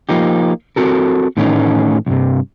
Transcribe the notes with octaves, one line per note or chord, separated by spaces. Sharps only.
F3 A#3 D#4 G4
C4 F#4 A4 A#4
A2 D#3 E3 A3 C#4 D#4
C2 G2 C3